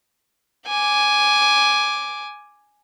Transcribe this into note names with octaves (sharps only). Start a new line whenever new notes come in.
G#5 D6